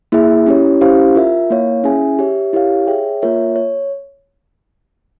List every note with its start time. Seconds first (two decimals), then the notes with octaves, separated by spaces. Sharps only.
0.12 A#3 E4 G#4 E5
0.46 C#4 E4 G4 C#5
0.81 C#4 E4 G4 C5 F5
1.15 F4 A#4 E5
1.50 A#3 E4 A#4 C#5 F5
1.84 C#4 E4 G#4 E5 G#5
2.19 G4 C#5 E5
2.53 E4 G4 A#4 C#5 F5
2.87 G#4 C#5 E5 G5
3.22 A#3 F4 A#4 C#5 E5
3.56 C#5